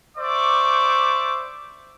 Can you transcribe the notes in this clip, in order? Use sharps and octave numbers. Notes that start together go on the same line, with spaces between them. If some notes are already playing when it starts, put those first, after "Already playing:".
C5 D5 E5 C#6 D6